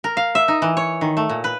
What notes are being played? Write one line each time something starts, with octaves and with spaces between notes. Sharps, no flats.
A#4
F5
E5
D#4
E3
C#5
D#3
A3
A#2
B4